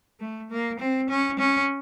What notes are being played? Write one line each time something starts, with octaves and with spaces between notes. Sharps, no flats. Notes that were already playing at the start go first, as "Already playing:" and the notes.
A3
A#3
C4
C#4
C#4